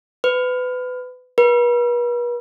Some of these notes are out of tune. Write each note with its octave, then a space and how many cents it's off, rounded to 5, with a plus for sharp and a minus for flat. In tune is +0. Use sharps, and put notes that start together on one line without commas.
B4 +25
B4 -40